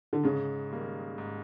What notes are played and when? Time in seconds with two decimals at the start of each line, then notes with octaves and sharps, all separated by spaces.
0.13 D3
0.23 G#2 C#3
0.71 D#3 G3 A#3
1.18 G#2